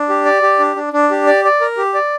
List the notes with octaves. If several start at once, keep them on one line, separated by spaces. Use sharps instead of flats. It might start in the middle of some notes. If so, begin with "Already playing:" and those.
Already playing: D4
G4
D5
G4
D4
D4
D4
G4
D5
D5
A#4
G4
D5